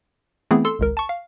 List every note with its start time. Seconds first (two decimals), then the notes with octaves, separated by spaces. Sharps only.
0.51 E3 A3 B3 C4 E4 G#4
0.65 A4 C6 E6
0.79 G#1 C#2 A#4
0.97 A5 C#6
1.09 F5